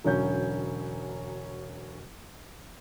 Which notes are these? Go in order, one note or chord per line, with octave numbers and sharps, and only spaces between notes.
E1 D3 F#3 C#4 G6